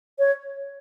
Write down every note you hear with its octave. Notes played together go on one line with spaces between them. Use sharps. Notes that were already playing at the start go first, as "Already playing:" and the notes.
C#5